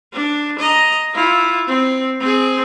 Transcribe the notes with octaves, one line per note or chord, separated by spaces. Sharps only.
D4
D#5 A#5
E4 F4
C4
C4 G#4